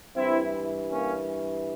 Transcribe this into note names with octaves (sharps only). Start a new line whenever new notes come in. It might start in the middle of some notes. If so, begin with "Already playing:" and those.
G2 E3 C4 E4
A#3 C#4